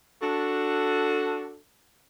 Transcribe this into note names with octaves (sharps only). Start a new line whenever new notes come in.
D4 F#4 A4